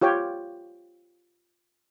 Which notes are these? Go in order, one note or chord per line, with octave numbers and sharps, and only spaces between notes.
F4 G4 C#5 G5